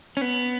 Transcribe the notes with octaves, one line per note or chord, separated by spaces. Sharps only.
C#4
B3